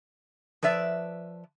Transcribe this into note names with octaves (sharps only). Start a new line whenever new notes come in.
F3 B4 D5 E5